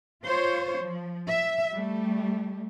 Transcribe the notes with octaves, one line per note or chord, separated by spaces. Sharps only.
F4 C5 C#5
F3
E5
G3 A3